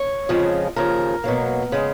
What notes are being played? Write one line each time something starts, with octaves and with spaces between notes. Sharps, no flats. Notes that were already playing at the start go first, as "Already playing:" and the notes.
Already playing: C#5
F2 C#3 F3 G#3
D#2 C#3 F3 A#4
B2 F#3 A#3
C#3 G#3